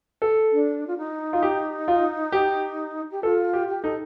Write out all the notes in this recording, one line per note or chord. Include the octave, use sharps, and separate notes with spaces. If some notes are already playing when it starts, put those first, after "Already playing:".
A4
D4
F4
D#4
F4
G4
F4
G4
G4
F4 A4
G4
G4
D#4 A4